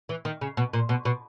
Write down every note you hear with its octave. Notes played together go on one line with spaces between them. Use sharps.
E3
D#3
C#3
B2
A#2
B2
B2